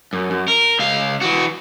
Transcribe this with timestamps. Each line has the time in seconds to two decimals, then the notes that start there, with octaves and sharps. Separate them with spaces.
0.13 F#2
0.31 F#2
0.48 A#4
0.79 C#2 F5
1.21 E3 F#4